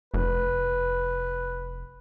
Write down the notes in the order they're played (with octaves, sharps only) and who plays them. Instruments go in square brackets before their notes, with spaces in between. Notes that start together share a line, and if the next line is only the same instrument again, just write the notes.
[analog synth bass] F1 [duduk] B4